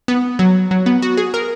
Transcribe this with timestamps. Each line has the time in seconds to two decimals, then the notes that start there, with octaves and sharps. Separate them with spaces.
0.08 B3
0.39 F#3
0.71 F#3
0.86 B3
1.02 F#4
1.17 G#4
1.34 A#4